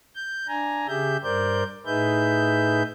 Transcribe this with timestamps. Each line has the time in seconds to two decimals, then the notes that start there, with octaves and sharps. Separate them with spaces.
0.15 G6
0.48 D4 G#5 A#5
0.88 C#3 G4 G#4 E5 G6
1.23 G2 A#4 C5 D5 G6
1.86 A2 D#4 G#4 B4 E5 G6